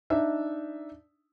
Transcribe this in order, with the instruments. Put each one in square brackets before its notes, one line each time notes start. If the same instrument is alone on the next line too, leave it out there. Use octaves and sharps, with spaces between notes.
[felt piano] D4 D#4 E5